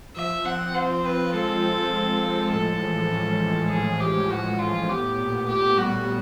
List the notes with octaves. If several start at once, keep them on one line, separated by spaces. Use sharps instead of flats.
F3 E5
C4 F#5
F4 C5
C4 B4
G#3 A4
G#3
G#3
F3
A2 A4
E3
C#4
E3
E3 G#4
G#3 G4
C#4 F#4
A2 F4
B3 G4
A#2
A#2 G4
G3 F#4